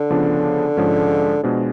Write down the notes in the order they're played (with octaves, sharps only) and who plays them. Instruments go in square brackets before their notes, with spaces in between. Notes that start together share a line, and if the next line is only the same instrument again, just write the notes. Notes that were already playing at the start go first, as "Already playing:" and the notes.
Already playing: [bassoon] D3
[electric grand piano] C#3 F3 B3 D4
G#2 F3 G#3 C#4
[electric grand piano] B2 G#3 D4 [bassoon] F3